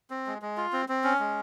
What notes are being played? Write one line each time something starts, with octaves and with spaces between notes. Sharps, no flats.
C4
G#3
G#3
F4
C4
C4
C#4
G#3